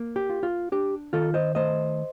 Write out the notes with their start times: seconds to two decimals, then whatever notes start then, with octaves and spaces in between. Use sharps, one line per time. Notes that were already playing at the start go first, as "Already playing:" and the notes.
Already playing: A#3
0.16 G4
0.30 F4
0.43 F4
0.72 D4 G4
1.13 D#3 F4 A4
1.34 C5 D#5
1.55 A3 C5 D#5